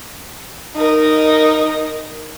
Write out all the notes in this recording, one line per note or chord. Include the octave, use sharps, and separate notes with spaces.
D#4 A#4